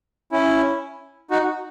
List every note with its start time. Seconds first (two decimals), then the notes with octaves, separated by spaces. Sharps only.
0.32 C#4 E4
1.31 D#4 F#4